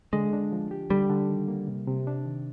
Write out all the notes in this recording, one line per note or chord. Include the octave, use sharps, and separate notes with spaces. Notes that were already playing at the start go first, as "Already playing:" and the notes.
D3 G#3
D4
F3
G4
D3 G3
D3
D#3
A#3
C3
C3
D4
D#3